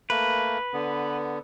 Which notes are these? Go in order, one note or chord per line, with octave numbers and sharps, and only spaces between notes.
A3 A#3 B4
D3 B3